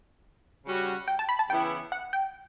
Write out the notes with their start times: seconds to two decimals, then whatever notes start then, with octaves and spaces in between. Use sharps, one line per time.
0.66 C#3 G3 C#4 F#4
1.08 G5
1.19 A5
1.29 B5
1.39 A5
1.50 C#3 E3 B3 E4 G5
1.92 F#5
2.13 G5